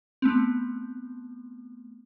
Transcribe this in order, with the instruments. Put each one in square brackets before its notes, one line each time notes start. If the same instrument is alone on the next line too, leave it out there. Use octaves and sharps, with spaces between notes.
[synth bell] A3 B3 C4